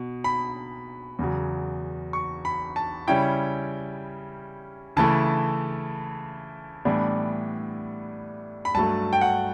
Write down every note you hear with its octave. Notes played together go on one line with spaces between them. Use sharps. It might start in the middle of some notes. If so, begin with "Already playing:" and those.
Already playing: B2
B5
E2 C#3 F#3
C#6
B5
A5
C#3 G3 C#4 E4 G5
C#3 E3 A3 E4 A5
A2 E3 G3 B3 D4
B5
G2 F#3 A3 A5
G5
F#5